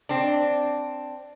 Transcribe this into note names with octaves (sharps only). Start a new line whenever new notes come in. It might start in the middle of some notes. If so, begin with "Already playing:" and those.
C4 D4